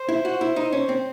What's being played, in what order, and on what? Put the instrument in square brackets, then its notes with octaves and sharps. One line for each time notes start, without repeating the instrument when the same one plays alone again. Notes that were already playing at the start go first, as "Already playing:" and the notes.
Already playing: [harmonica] C5
[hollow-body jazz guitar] E4
F#4
E4
D#4
C#4
C4